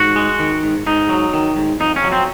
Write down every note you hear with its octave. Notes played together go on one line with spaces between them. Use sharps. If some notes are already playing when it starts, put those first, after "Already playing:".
Already playing: G#2 F#4
G#3
D#3
G#2
G#2 D#4
F#3
D#3
G#2
F2 D#4
C#4
F#3
C4